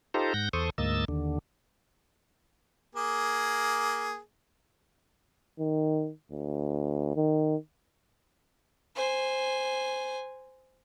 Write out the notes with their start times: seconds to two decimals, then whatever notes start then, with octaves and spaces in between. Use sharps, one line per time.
0.14 D#4 F4 G4 A4 C5 A#5
0.34 G#2 F#5 G6 A#6
0.53 E2 A4 C5 C#6 D#6
0.78 D2 G#2 A#3 D#5 E6 A6
1.08 D#2 D3
2.95 A#3 G#4
5.59 D#3
6.32 D2
7.16 D#3
8.96 C5 G#5